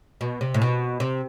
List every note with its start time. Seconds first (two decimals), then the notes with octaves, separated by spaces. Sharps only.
0.21 B2
0.41 C3
0.54 A2
0.62 B2
1.00 C3